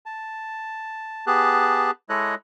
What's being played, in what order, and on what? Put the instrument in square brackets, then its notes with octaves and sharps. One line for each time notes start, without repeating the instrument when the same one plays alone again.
[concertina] A5
B3 G4 G#4 A5 F#6
G#3 E4 A4 C#5 D#5 F#6